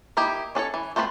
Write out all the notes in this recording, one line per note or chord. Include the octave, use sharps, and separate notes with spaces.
A#3 D#4 E4 G4
C#4 D4 A4 C#5
E3
A3 C4 F4 F#4 B4